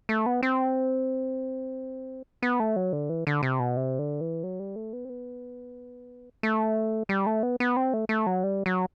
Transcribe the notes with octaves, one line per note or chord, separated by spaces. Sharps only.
A3
B3
C4
B3
A3
F#3
D3
E3
D3
C3
B2
C3
D3
E3
F#3
G3
A3
B3
C4
B3
A3
G3
A3
B3
B3
C4
A3
A3
F#3
G3
F#3